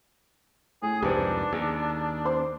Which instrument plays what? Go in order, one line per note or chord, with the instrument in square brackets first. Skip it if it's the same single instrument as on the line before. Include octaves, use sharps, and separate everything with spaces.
[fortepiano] A2 [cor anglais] G#4
[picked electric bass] C2 F2 G#2 [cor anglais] D4 [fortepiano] G4 B4 C5
[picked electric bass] D#2 [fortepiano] G#4
[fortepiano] C5 C6 D6